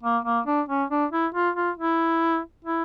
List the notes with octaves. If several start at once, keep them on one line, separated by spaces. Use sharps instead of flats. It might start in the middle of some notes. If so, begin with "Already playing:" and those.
A#3
A#3
D4
C#4
D4
E4
F4
F4
E4
E4